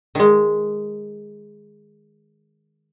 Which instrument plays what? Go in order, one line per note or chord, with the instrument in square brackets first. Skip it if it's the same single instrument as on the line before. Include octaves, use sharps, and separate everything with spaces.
[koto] D#3 G#3